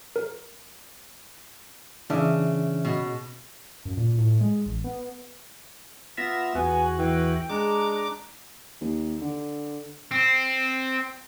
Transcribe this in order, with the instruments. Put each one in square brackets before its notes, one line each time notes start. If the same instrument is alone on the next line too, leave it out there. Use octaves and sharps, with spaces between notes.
[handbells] A#4
[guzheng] C#3 [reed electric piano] E3 D4 E5
[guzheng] B2
[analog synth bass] F#2
A#2
A2
G#3
A1
B3
[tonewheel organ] B3 F4 E5 [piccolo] A#6
[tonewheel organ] E2 F#4 [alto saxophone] B3 [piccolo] G#5
[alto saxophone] E3 [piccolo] G5
[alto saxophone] G#3 [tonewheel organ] D4 D6 [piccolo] A#5
[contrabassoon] D#2
D3
[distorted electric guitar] C4